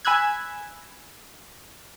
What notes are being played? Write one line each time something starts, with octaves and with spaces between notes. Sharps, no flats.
G#5 B5 E6 F#6 G#6